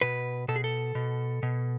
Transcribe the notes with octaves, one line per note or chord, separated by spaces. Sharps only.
B2 B4
B2 A4
G#4
A4
B2
B2